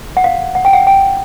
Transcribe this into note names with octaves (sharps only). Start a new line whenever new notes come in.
F#5
F5
F#5
G5
F#5
G5